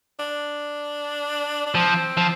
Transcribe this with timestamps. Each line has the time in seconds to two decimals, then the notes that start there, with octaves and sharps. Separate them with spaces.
0.19 D4
1.66 D4
1.75 F3 C4
2.17 F3